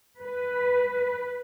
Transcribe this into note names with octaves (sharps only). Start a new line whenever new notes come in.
B4